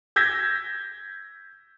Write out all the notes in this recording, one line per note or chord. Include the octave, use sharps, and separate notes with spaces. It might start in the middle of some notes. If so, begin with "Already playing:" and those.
E6 G6 G#6 A#6 B6